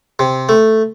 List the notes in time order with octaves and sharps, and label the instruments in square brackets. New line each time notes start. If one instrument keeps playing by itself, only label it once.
[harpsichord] C3
A3